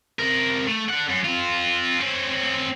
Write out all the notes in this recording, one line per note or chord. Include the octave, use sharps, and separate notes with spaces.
C3 A#4
A3
D4 F#5
F#2
C4 F4
C4 C#4